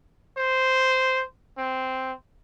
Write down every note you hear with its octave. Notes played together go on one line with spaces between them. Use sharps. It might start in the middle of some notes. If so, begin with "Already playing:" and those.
C5
C4